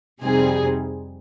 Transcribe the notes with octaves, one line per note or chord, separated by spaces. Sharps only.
F2 C3 G3 C4 D#4 G#4